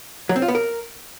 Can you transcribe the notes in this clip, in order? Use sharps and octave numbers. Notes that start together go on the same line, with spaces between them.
F#3
C4
F4
B3
A#4